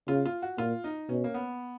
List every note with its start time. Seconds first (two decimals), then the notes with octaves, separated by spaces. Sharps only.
0.08 C#3 F4
0.26 F4
0.42 F#4
0.58 A#2 F4
0.84 D#4
1.09 B2 C#4
1.24 A#3
1.34 B3